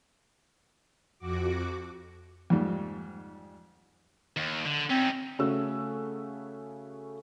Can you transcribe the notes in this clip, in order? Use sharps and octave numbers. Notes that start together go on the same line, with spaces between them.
F2 F#4 D6
F2 G#2 D#3 G3
D#2
D3
C4 C#4 D#4
C#3 A3 C#4 F#4 A4 E6